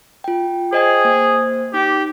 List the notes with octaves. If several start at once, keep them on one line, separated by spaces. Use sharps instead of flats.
F4 G5
G#4 C5 D#5 G5
A#3 C5 D#6
D#4 G4 D6